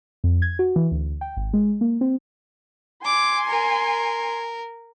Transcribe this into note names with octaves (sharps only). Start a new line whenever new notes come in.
F2
G#6
F#4
E3
D2
G5
G#1
G#3
A#3
C4
G#5 C6 D6
A#4